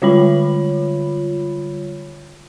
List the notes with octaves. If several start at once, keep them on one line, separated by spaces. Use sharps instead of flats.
D3 G3 F4 C#5 B5 F#7